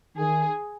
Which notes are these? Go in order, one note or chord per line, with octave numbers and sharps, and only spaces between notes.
D#3 G#4